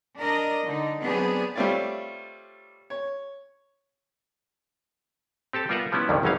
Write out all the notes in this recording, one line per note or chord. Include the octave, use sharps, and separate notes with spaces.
D4 A#4 D#5
D3 D#4
F#3 B3 C4 D4 G#4
G3 A3 C4 F4 C#5 D5
C#5
C4 G4 A4 A5
G3 B3 F4 A#4 E5 F#5
F3 G3 B3 C#4 E4
C2 F2 D3 D#3 F3 G3
G#1 E2 F#3 G3 C#4 F5